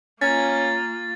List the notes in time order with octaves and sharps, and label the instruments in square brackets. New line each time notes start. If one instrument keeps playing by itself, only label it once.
[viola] A#3 F4 [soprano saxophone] C#4 [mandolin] A#4 G#5 [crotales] A6